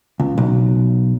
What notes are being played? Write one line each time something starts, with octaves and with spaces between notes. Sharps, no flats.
C#2
B1